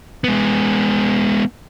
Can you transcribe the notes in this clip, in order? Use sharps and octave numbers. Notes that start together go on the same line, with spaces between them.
G#3 B3